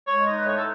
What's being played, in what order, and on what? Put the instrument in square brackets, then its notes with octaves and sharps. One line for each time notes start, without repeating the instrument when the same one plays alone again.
[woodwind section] G#3 C#5
D#4 D#5
B4
A2 C#5
A4